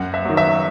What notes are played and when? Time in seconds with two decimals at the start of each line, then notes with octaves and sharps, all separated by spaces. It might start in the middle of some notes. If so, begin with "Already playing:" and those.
Already playing: F#2 F#5
0.14 E5
0.25 D#3 F#3
0.37 E5